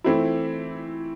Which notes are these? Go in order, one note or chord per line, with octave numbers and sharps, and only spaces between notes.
E3 A3 C4 E4